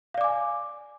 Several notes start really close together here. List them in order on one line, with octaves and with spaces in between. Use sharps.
F5 D5 D6 G#5